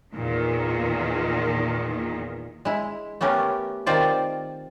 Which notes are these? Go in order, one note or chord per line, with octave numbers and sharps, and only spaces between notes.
E2 A#2 D#3
G#3 E4
A3 B3 C#4 G4 A#4
D#3 C4 F4 C5 D5